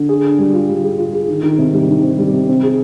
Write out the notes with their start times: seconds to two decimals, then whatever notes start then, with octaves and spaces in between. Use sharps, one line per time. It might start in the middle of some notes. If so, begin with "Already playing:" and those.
Already playing: D3
0.09 G#4
0.24 D4
0.39 G3
0.54 F4
0.69 G3
0.84 G#4
0.98 F4
1.13 G#4
1.28 D#3
1.43 D#3
1.58 C3
1.73 G3
1.88 D#3
2.03 C4
2.18 G3
2.33 C3
2.48 C4
2.63 G#4